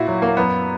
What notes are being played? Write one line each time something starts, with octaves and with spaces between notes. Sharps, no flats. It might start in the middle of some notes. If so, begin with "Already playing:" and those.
Already playing: A#2 E4 F#4
F#3
A#3
F#2 B3